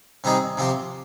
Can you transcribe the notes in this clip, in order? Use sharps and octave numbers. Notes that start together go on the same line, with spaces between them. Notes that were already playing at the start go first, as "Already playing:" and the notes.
C3 G3 C4 D#4 G#4
C3 F3 C4 G4